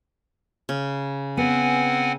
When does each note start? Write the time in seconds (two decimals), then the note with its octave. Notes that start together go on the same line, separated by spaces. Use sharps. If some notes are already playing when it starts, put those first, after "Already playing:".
0.69 C#3
1.37 B3 C4 F#5 G#5